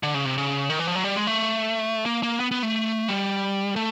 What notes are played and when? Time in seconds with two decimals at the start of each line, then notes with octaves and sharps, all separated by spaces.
0.03 D3
0.14 C#3
0.25 C3
0.38 C#3
0.70 D#3
0.79 E3
0.87 F3
0.95 F#3
1.04 G3
1.16 G#3
1.27 A3
2.06 A#3
2.23 A#3
2.40 B3
2.51 B3
2.63 A3
3.08 G3
3.76 A3